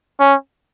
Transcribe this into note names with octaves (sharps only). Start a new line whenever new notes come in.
C#4